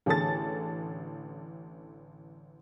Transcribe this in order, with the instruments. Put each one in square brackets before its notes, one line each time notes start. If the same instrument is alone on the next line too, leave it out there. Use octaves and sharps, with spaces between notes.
[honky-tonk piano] A1 D3 G#4 A4 A5 A6